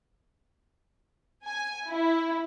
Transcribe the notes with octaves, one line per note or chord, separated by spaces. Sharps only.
G#5
E4